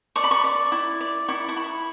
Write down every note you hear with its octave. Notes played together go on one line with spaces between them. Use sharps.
D5 C#6
B5
C#6
D5
E4
D5
E4 C#6
C#6
E4 B5